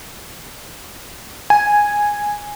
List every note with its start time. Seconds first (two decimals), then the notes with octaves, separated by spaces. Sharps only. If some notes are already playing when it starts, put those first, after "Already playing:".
1.50 G#5